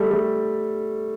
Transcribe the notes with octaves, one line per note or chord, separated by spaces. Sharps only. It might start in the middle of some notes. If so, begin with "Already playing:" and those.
Already playing: G3 A3
A3